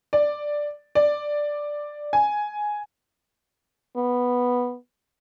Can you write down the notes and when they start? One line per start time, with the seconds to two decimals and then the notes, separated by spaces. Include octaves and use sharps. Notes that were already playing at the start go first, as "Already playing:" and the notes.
0.13 D5
0.95 D5
2.13 G#5
3.96 B3